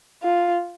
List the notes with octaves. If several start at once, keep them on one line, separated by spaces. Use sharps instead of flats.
F4